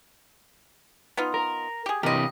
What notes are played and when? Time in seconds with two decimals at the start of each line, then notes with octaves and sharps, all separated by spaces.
1.17 B3 D#4 F4
1.34 A#4
1.86 G4 G#4
2.03 C3 E3 G4 A#4 D#5